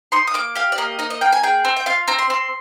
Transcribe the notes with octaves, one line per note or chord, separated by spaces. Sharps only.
D#4 C6
D#6
A#3 D6
G4 F5
D5
A#3 D#5
D#4 D#5
D#5
A#3 G5
G#5
G#4 G5
C4
G5
F4 F5
C4 A#5
C6
C4 C6